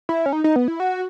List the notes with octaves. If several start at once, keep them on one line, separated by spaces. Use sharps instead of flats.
E4
C#4
D#4
D#4
B3
E4
F#4